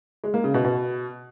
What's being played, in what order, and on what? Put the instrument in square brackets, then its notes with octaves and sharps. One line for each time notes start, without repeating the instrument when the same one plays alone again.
[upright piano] G#3
A#3
C#3
B2
B2